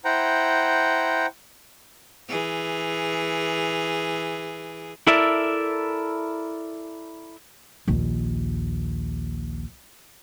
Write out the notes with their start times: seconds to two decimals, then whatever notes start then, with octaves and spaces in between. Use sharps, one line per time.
0.05 E4 C5 F#5 G5 A#5
2.29 E3 G#4
5.07 E4 A4 A#4 D5 E5
7.88 A#1 D#2